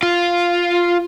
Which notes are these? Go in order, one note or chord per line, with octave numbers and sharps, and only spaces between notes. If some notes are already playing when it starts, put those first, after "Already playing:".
F4